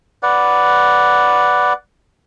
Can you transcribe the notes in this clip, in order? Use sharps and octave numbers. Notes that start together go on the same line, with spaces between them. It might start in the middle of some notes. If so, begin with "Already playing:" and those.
B4 D5 F#5